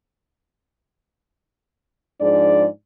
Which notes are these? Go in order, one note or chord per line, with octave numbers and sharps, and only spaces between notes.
G#2 F3 D4 G#4 D5